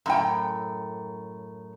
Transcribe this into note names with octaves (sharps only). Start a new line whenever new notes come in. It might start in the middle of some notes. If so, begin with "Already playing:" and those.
F#2 A2 G5